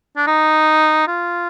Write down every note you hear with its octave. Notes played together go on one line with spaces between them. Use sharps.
D4
D#4
F4